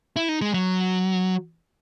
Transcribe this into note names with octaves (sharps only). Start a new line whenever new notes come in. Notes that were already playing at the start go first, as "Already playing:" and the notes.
E4
D#4
G#3
F#3